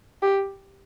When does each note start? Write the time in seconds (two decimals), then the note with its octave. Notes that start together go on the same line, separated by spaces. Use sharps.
0.23 G4